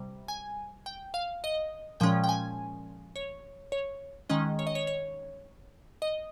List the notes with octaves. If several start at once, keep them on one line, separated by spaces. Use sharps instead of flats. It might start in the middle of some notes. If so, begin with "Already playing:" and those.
Already playing: C3 G3
G#5
G5
F5
D#5
A#2 F3 G#3 C#4 G5
G5
G#5
C#5
C#5
D#3 G#3 C#4 D#5
C#5
D#5
C#5
C#5
D#5